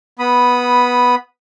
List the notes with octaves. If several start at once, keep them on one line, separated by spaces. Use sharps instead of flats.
B3 B5 D#6